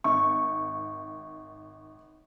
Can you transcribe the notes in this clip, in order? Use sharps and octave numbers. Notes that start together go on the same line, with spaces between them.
G#1 C#6